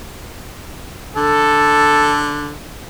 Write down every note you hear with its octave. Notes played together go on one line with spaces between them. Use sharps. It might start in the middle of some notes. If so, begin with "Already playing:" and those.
D3 A4